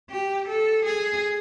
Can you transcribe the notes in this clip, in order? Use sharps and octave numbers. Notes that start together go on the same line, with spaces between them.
G4
A4
G#4